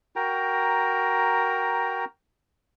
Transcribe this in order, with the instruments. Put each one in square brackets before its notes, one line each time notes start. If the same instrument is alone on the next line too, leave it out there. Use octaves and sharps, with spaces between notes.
[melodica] F#4 A#4 G5 A#5